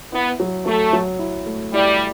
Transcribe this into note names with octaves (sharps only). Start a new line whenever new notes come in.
B3 E4
F#3
F#3 A3
F#3
E4
A3
G3 E4